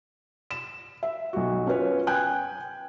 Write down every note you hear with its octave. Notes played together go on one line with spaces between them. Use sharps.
E7
E5
B1 F#4
C#4 F4 B4 C#5
G5 G#5 F#6 G6